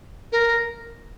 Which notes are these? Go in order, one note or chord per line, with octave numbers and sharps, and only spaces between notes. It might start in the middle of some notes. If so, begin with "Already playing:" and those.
A#4